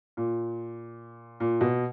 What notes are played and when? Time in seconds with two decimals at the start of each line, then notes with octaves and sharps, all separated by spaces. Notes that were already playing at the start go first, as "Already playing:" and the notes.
0.17 A#2
1.40 A#2
1.61 B2